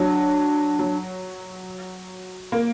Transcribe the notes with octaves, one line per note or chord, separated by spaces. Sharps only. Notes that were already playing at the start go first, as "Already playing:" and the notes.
Already playing: F#3 D4
F#3
A#3